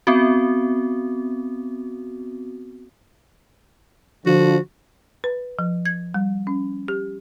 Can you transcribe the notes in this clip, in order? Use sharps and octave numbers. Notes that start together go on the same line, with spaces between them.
B3 C4 F#4
D3 F3 F#4
B4
F3
G#6
G3
C#4
G4